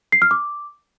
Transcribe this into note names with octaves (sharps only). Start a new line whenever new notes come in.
C7
F6
D6